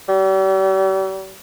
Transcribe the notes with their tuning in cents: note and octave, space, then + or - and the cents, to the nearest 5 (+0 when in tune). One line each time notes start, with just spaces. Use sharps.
G3 -40